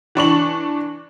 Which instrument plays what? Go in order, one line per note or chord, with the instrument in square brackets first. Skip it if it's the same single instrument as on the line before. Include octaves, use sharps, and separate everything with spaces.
[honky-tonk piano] E3 D4 C#6 F#7